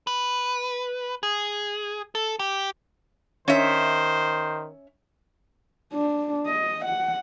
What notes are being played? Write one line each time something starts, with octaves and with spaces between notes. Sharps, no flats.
B4
G#4
A4
G4
D#3 C#4 C5 C#5 E5
D4
D#5
F#5